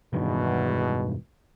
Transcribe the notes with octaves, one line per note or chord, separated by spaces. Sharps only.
E1 E2 G2 B2 D#3